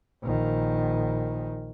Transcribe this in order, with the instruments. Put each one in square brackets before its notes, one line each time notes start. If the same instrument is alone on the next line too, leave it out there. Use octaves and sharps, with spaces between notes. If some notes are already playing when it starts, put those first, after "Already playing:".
[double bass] A#1 D#3